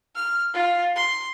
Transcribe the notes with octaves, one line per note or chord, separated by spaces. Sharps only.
F6
F4
C6